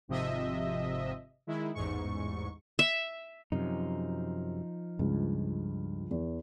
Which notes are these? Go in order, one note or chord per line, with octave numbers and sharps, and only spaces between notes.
G#1 C3 F3 D#5 E5
D#3 G#3 E4
A1 E2 G#2 C#6
E5
F#2 C3 F3 D#4
C#2 G2
E2